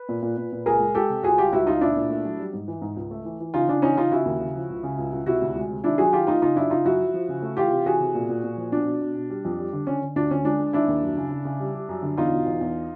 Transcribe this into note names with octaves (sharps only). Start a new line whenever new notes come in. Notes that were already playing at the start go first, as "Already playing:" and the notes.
Already playing: B4
A#2
A#2
A#2
A#2
C#2 G#4 A#4
G#3
G#3 G4 A4
C3
C#2 F#4 G#4
G3 F4 G4
C#2 E4 F#4
C#2 D#4 F4
A#2 D4 E4
A#2
A3
F#3
G3
G#2
E3
G#2
C#2
A3
E3
E3
C#3 D#4 F4
C#3 D4
E3 C#4 D#4
C#3 D#4 F4
C#3 E4 F#4
D#2
C#3
F3
C#2
C#3
C#2
C#2
C3 E4 F#4
D2
G#3
C3
D#3 D4 E4
F#3 F#4 G#4
D#3 F4 G4
A3 D#4 F4
C#3 D#4 F4
F#2 D4 E4
C#3 D#4 F4
F#2 E4 F#4
F3
F3
C#3
A3
E3 F4 G4
C3
E3 F#4 G#4
C3
A#2
A#2
A#2
F3
B2 D4
B2
B2
B2
G3
F2
G3
D3
D3 C#4
D3
D2 D4
D3 C#4
G#3 D4
G#3
D#3 D4 E4
D#2
F#2
C#3
C#3
C#3
G3
G3
F#2
D3
E2 D#4 F4
B2
E2
E2